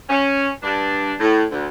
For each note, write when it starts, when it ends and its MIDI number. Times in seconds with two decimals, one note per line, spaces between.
0.10 0.48 61
0.63 1.14 43
0.63 1.14 62
1.20 1.44 45
1.51 1.67 38